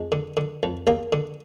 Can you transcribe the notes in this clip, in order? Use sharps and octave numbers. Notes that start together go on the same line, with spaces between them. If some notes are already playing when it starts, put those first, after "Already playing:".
Already playing: F2 G#3
D3
D3
F2
D#2 A#3
D3